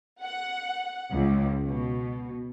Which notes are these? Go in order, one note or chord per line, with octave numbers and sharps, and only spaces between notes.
F#5
C#2
B2